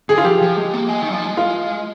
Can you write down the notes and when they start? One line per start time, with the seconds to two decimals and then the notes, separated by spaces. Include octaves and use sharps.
0.09 D3 G#4
0.18 F4
0.24 F3 G4
0.42 F3
0.57 G#3
0.74 A#3
0.89 G#3
1.02 D#3
1.09 G3
1.13 F3
1.25 G#3
1.37 F4